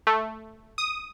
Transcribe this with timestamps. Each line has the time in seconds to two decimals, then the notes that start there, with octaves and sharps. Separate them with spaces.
0.07 A3
0.78 D#6